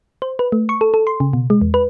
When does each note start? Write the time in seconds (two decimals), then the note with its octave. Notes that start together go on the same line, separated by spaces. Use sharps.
0.22 C5
0.39 B4
0.52 A3
0.69 C#6
0.81 A4
0.94 A4
1.07 C6
1.20 C#3
1.33 B2
1.50 G#3
1.61 E2
1.74 B4